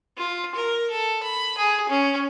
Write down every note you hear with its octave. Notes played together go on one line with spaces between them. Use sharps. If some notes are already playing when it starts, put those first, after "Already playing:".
F4
A#4
A4
B5
G#4
C#4